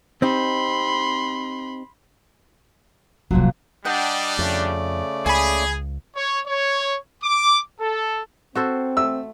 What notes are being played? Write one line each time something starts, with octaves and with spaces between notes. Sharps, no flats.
C4 D#4 G4 B5 C6
D1 C2 F2 A#2 F#3
G3 D4 D#5 F#5 G5
F2 C#3 A3 D5
C#2 G#4 G#5 B5
C#5
C#5
D6
A4
C4 F#4 A4 C5
A3 E6